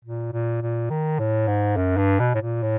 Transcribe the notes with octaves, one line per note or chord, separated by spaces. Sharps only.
A#2
A#2
A#2
D#3
A2
G#2
F#2
G2
B2
A2
A#2
A2